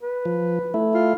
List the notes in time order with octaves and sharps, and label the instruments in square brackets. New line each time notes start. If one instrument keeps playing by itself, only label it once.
[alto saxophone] B4
[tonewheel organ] F3
A3 E4
[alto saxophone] F4